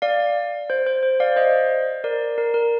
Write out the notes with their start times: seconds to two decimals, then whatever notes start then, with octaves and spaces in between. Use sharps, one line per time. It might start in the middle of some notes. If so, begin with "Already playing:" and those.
0.02 D5 F5
0.70 C5
0.87 C5
1.03 C5
1.20 D5 F5
1.36 C5 D#5
2.04 A#4 D5
2.38 A#4
2.54 A#4